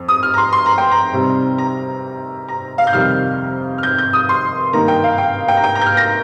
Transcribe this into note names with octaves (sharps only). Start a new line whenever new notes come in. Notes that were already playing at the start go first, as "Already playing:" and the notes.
Already playing: F2
D#6
F6
A#5
C6
C6
A#5
G5
A#5
C3 G3 C4 D#4
A#5
A#5
F5
G6
F2 C3 D#3 G3 D#4 F6
F6
G6
G6
D#6
C6
G2 D#3 A#3 D#4 A#5
G5
F5
G5
G5
A#5
G5
A#5
G6
F6
A#6